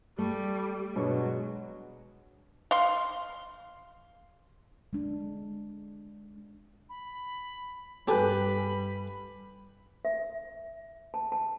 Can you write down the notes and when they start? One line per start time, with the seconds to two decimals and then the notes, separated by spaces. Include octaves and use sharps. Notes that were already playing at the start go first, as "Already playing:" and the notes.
0.18 G3 A3
0.96 G2 B2 F#3 G#3 B3 C#5
2.71 F5 C6
4.93 G#3 D4
6.89 B5
8.08 G2 G3 C4 G4 A4 B4 G#5 B5
10.05 E5
11.14 A5
11.32 A5